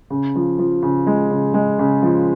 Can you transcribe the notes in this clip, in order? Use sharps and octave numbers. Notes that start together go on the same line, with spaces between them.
C#3
F3
F3
C#3
G#3
C#3
G#3
C#3
F3